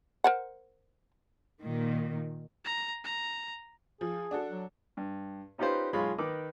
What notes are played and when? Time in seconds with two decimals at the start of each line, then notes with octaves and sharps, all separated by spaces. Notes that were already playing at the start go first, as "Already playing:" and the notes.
0.24 A#4 C5 F#5
1.61 A#2 D#3
2.65 A#5
3.04 A#5
4.01 F3 G#4
4.31 D4 F#4 A4
4.50 F#3
4.97 G2
5.58 C#4 D#4 F4 G4 B4 C5
5.93 B1 G#3 F4 G#4 C#5 B5
6.18 D#3 D#4 B4 D6